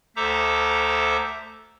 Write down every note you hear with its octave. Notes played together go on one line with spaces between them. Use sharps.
D2 A4 C5 E5 A#5 D6